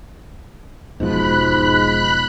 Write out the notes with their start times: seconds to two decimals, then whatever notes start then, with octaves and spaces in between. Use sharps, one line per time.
1.00 E1 G#2 B2 F3 B5 F#6